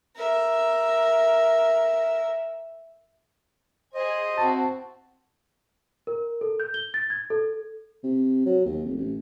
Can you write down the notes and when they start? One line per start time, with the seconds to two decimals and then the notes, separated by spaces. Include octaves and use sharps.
0.16 A#4 E5
3.94 G#4 C5 D#5 G#5
4.38 C4 E4 F#4 A5
6.07 A#4
6.41 A4
6.60 G6
6.74 G7
6.94 A6
7.10 G#6
7.30 A4
8.03 C3
8.46 F#3
8.65 D#2
8.84 F1
8.97 A1